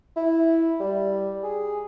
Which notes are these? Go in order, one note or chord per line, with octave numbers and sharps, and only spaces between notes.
E4
G3
G#4